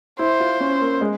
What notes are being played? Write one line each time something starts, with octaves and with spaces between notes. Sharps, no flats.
E4 C5
F4
C#4
A#3
G#3